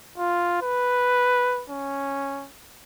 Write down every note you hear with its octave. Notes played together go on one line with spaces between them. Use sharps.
F4
B4
C#4